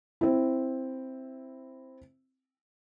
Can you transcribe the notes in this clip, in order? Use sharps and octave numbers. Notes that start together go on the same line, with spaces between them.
C4 E4